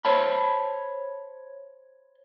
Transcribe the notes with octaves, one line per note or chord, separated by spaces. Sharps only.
C5 C#5 A5 B5